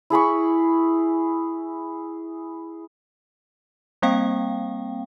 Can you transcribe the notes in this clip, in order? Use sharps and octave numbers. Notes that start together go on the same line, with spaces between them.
E4 G#4 B5 C#6
G3 A#3 C4 F5 G5